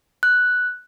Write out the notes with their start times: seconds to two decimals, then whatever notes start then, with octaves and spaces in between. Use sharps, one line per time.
0.23 F#6